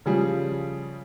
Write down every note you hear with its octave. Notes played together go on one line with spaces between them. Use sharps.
C#3 F3 G3 G#4